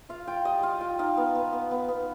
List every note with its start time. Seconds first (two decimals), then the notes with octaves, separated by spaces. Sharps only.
0.09 F4 F5
0.27 F4 G5
0.45 G3 D#5
0.63 F4 F5
0.81 F4 G5
0.99 D#4 F5
1.17 B3
1.35 B3
1.52 B3
1.71 B3
1.88 B3